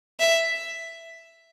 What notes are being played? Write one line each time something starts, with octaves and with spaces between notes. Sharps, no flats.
E5